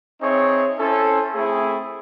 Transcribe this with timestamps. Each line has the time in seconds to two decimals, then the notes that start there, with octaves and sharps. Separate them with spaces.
0.20 C4 D#4 G#4 C#5 E5
0.77 C#4 E4 A4 C5
1.32 A3 C4 E4 G#4